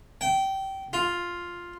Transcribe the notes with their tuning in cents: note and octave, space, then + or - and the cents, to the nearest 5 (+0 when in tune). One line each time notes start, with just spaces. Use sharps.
G5 -20
F4 +5